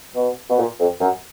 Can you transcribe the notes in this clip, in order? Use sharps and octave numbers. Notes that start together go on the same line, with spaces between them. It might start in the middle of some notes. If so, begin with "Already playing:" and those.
B2
B2
A#2
F2
F#2